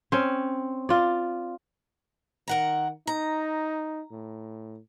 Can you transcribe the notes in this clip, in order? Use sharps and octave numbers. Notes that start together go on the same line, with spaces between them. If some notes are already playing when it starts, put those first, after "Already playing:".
C4 C#4 C#5
F4 D5
D#3 A#4 F#5 A#5
D#4 A#5
A2